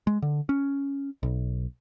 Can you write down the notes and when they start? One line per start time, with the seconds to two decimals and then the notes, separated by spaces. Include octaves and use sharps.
0.07 G#3
0.22 D3
0.49 C#4
1.23 B1